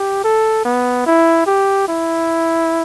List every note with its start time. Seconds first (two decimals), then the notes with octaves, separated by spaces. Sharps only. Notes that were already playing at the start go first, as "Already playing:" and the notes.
Already playing: G4
0.24 A4
0.65 B3
1.06 E4
1.47 G4
1.88 E4